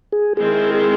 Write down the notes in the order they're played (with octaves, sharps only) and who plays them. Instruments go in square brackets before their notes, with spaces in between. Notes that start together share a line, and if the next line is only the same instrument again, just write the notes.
[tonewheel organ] G#4
[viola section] D#3 G#3 C4 E4 [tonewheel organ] G#4
[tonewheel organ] G#4